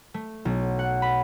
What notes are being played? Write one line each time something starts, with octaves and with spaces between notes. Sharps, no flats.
A3
B1
F#5
B5